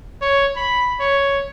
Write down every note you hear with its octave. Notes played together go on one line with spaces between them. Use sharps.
C#5
B5
C#5